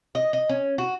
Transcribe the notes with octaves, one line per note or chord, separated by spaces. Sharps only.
D#5
D#5
C#4
F#4